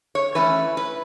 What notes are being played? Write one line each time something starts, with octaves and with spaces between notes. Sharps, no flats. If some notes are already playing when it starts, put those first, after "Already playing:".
C#5
E3 A3 C#4 B4
B4